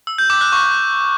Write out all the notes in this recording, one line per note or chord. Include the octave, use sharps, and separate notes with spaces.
E6
G6
D6
F#6
C#6